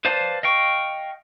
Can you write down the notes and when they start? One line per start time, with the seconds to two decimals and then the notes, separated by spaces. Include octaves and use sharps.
0.05 B4 C5 D5 F5 A5
0.43 D#5 F5 G5 C#6